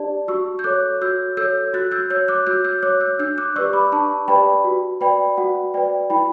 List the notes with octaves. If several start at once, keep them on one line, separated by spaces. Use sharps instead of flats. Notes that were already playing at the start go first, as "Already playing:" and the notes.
Already playing: D4 G4 D5 A5
F#4 C#6 E6
G6
A4 C#5 D6 F#6
F#4 E6 G6
A4 C#5 E6 G6
F#4 F#6 A6
E6 G6
C#5 E6 G6
D6 F#6
F#4 E6 G6
E6 G6
C#5 D6 F#6
E6 G6
D4 E6 G6
D6 F#6
G4 B4 D5 C#6 E6
B5 D6
D4 A5 C#6
G4 B4 D5 G5 B5
F#4
B4 D5 G5 B5
F#4 F#5
B4 D5 G5
E4 G5 B5